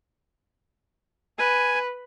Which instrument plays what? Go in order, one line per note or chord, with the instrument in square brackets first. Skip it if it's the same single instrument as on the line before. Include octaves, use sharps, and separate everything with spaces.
[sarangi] B4 [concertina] G#5